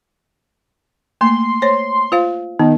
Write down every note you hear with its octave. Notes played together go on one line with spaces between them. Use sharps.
A3 A#3 C6
C5 C#5
F4 C5 F5
D#3 B3